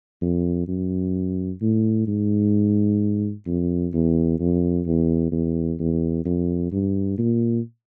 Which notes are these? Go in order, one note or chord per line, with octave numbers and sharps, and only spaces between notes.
F2
F#2
A2
G#2
F2
E2
F2
E2
E2
E2
F2
G2
A#2